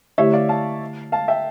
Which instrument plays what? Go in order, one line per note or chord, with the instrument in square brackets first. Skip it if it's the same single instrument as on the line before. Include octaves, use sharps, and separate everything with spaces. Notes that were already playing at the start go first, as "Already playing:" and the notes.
[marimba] D3 A3 E4 G4 [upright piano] C#5 E5
[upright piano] D5 F5
F5 A5
F5 A5
E5 G5